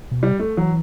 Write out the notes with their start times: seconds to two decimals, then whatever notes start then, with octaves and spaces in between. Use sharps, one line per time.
0.11 B2
0.22 C3 G3
0.39 A3
0.57 E3 F#3